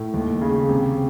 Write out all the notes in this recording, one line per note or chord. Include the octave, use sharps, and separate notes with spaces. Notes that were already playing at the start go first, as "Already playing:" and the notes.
Already playing: A2
D#2
C#3
C3